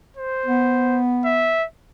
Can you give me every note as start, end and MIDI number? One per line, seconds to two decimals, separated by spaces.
0.16 1.01 72
0.46 1.58 59
1.25 1.65 76